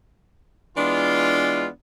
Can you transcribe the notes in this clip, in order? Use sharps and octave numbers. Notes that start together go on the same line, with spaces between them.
E3 G#3 B3 D4 F4